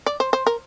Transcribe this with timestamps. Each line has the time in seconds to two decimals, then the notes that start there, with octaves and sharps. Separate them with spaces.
0.06 D5
0.20 C5
0.33 C5
0.47 A#4